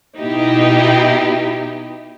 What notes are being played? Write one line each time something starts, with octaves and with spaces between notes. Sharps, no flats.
B2 D#4 E4 G4